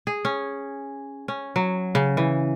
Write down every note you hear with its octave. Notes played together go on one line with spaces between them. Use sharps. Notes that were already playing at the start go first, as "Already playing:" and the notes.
G#4
C#4
C#4
F#3
C#3
E3